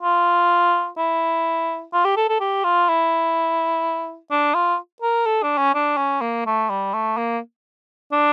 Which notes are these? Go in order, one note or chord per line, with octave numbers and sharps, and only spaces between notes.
F4
E4
F4
G4
A4
A4
G4
F4
E4
D4
F4
A#4
A4
D4
C#4
D4
C#4
A#3
A3
G3
A3
A#3
D4